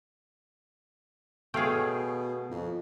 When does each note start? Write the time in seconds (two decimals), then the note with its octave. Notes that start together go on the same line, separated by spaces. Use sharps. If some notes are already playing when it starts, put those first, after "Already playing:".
1.54 B2 A3 G#4 C#5 F5 G5
2.52 F2